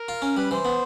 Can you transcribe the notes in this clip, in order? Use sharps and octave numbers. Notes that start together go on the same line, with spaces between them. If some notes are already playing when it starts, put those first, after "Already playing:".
Already playing: A#4
F4
C#4
G3 B4
E3 C5
B3